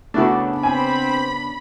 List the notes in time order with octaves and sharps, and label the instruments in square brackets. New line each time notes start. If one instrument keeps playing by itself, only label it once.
[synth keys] C#3 B3 D4 [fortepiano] A3 E4 F#4
[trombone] C4 [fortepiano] G#5 [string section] B5